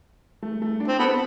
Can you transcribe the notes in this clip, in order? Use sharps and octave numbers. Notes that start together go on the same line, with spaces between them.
A3
A3
D4
C4
B3 A4